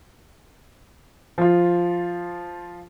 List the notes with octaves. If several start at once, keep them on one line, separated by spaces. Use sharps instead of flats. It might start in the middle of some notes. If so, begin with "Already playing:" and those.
F3 F4